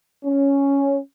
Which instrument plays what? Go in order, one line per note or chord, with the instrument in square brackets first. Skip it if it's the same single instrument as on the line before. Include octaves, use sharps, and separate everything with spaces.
[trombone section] C#4